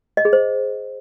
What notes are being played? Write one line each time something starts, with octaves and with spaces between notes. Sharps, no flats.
D#5
G#4
C5